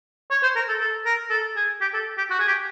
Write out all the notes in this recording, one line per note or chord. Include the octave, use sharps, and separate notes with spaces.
C#5
C5
A#4
A4
A4
A#4
A4
G#4
G4
A4
G4
F#4
G#4
G4